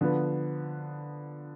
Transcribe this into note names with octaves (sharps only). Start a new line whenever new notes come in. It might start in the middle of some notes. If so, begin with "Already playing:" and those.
D3 F3 B3